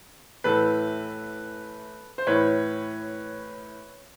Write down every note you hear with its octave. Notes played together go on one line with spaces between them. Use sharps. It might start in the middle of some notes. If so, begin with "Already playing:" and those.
A2 E3 A4 B4
C5
A2 E3 B4 C#5